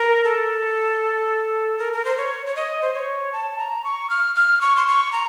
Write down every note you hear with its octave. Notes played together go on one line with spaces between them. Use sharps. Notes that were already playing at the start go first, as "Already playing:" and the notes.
Already playing: A#4
A4
A#4
A#4
C5
C#5
C#5
D#5
C5
C#5
A5
A#5
C#6
F6
F6
C#6
C6
C#6
A#5